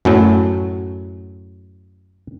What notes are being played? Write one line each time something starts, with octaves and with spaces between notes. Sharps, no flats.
F#2 A2 F#3